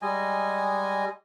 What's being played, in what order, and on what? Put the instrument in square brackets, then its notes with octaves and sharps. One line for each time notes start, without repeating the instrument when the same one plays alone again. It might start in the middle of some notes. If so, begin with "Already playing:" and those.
[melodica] G3 G#3 D#5 G#5